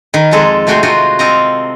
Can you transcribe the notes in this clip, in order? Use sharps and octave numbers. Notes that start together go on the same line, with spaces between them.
D#3 B4
F2 G#3 A4 A5 A#5
C3 A3 F#4 G5 G#5 C6
F4 F#4 A#4 C5 D#5 F#5
C4 A4 A#4 D#5 F5 A#5